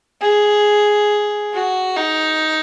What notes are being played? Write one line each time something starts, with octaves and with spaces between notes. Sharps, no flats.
G#4
F#4
D#4